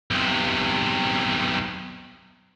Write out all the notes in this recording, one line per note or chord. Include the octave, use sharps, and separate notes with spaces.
B1 C3